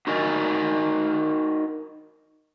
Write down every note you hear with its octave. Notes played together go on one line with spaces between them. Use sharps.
D#4 F#4 A#4 D#5 G#5